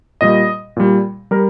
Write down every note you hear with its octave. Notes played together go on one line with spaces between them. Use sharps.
A#2 G3 D#5
A#2 G3
G3 A#4